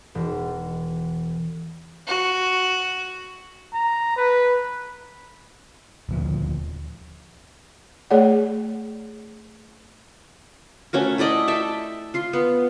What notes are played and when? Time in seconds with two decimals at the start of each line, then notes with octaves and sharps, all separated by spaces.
0.15 E1
2.07 F#4
3.73 A#5
4.16 B4
6.09 D#1 D2 F3
8.11 A3 G#4 C#5 D5 F#5
10.93 A3 C#4 F#4 A#4
11.18 E4 A4 D5 D#5
11.48 A4 E5 G5 A5
12.14 F4 C6
12.33 B3